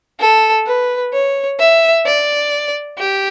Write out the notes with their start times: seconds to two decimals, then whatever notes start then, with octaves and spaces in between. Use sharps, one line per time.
0.20 A4
0.67 B4
1.13 C#5
1.59 E5
2.06 D5
2.98 G4